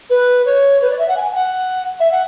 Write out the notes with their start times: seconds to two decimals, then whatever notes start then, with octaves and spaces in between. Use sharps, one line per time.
0.09 B4
0.45 C#5
0.81 B4
0.89 D5
0.98 E5
1.08 F#5
1.16 G#5
1.34 F#5
1.99 E5
2.11 F#5